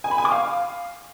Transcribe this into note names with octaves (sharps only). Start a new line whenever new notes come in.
G#5
B5
G#5
D6
F5